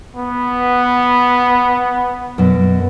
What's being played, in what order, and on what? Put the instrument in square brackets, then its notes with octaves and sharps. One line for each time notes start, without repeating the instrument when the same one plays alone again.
[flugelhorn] B3
[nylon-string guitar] F#2 B2